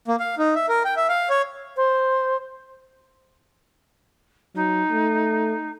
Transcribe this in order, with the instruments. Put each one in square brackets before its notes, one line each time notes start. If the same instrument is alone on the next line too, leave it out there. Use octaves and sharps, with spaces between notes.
[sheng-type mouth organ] A#3
F5
D#4
E5
A#4
G5
E5
F5
C#5
[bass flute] C5
[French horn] F#3 [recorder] D#4
[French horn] A3